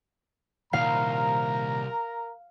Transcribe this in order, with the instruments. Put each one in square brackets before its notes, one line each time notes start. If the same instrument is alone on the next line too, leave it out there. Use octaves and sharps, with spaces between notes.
[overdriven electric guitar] C2 [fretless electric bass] A#2 D#3 [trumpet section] A#4 A#5 [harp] F5